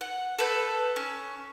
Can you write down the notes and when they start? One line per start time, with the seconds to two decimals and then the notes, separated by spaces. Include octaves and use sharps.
0.01 F#5
0.39 A4 B4 G6
0.96 C#4